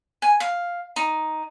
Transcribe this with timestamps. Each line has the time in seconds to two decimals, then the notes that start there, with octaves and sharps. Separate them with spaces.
0.22 G#5
0.40 F5
0.96 D#4